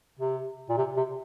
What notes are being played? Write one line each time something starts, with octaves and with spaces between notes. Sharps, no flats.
C3
A#2
C3
C3